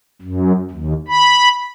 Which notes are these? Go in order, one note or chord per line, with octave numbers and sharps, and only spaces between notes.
F#2
D#2
B5